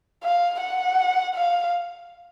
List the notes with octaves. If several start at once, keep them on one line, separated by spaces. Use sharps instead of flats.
F5
F#5
F5